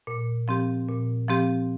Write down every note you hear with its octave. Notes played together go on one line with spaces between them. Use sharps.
A#2
F3 C4 G4
A#2
F3 C4 G4